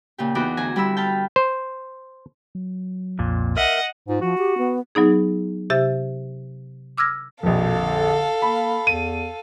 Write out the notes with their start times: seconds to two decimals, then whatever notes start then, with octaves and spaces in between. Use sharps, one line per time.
0.18 A#2 C#3 G4
0.35 E2 B3 D#4 F#4 D6
0.57 D2 G#5 A#5
0.76 G3 C4 E4 B5 E6
0.97 G5 A5 B5 F6
1.36 C5
2.55 F#3
3.19 B1 F2 A#2
3.57 A#4 D#5 E5 F#5
4.08 G#2 F4
4.21 F3 F#4
4.38 G4
4.58 B3
4.95 F#3 B3 D#4 G#4
5.70 C3 G4 E5 A6
6.98 D6 E6 F6 G#6 A#6
7.43 A#1 F2 B2 A4 F5
7.80 D3
8.42 A#3 B5
8.87 E2 D#7